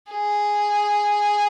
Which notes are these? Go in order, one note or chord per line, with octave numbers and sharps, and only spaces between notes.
G#4